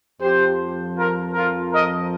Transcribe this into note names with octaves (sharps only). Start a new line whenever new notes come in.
F2 F3 G4 C5
F4 A#4
F4 A#4
A#4 D#5